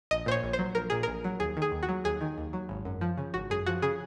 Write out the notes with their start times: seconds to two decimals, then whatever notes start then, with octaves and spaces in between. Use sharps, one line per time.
0.11 A#1 D#5
0.26 A#2 C5
0.31 C#5
0.43 A#1
0.53 C5
0.59 F#3
0.75 A#1 A#4
0.90 A#2 G#4
1.03 A#1 A#4
1.24 F#3
1.40 D#2 G#4
1.57 D#3
1.62 G#4
1.72 D#2
1.83 F#4
1.89 F#3
2.04 D#2 G#4
2.21 D#3
2.38 D#2
2.53 F#3
2.69 G#1
2.85 F#2
3.01 F3
3.18 C#3
3.34 G#1 F#4
3.50 F#2 G#4
3.67 F3 F#4
3.82 C#3 G#4